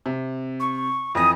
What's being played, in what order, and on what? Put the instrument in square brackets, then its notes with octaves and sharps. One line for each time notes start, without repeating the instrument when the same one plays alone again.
[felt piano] C3
[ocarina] C#6
[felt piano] F2 E3 A#6 [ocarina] D#6